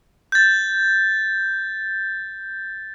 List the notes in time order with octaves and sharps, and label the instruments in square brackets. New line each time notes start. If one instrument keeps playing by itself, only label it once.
[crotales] G6 A6